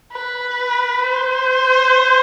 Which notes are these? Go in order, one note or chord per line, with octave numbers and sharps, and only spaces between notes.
B4
C5